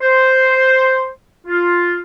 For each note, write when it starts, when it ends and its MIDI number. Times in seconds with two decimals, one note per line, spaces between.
0.01 1.09 72
1.46 1.97 65